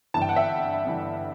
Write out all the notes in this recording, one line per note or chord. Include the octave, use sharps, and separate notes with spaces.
G1 G2 E3 A5
G5
F#5
E5 G5
G1 G2 E3